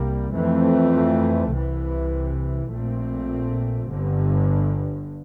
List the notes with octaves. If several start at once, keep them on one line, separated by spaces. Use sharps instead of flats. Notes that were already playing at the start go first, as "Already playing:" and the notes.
Already playing: C2 C3 G3 A#3
F2 E3 A3 C4
C2 C3 E3
A#1 A#2 A3 C4
G1 G2 D3